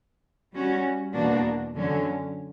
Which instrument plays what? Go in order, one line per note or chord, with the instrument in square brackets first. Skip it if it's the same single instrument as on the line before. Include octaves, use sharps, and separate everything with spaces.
[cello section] G3 C#4 F#4
E2 B2 A#3 D4 F#4
F#2 D3 F#3 C#4